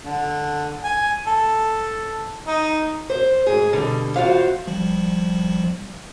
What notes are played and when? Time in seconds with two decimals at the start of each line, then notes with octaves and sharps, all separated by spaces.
0.05 D3
0.84 G#5
1.27 A4
2.47 D#4
3.10 C5
3.47 G#2 G#4
3.73 B2 D3 G3
4.16 E2 F4 F#4 C5 F5
4.67 G#1 F3 G3